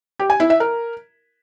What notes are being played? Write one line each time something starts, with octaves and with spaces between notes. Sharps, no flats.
G4
G#5
E4
E5
A#4